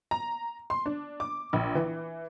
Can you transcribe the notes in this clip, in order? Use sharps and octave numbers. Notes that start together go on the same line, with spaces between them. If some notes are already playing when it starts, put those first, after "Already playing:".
A#5
C6
D4
D6
A#1
E3